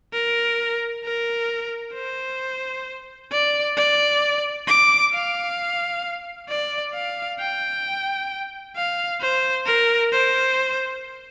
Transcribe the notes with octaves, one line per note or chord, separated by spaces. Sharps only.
A#4
A#4
C5
D5
D5
D6
F5
D5
F5
G5
F5
C5
A#4
C5